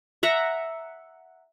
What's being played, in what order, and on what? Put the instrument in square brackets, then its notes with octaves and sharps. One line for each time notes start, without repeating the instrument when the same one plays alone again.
[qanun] E5 F#5 A#5